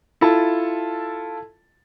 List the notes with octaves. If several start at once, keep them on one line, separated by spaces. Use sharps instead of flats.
E4 F4 A4 A5